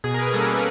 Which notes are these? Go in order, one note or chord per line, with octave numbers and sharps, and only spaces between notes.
B2 G#4
A#4
B4
G3 A#3 C#4 A4
A#4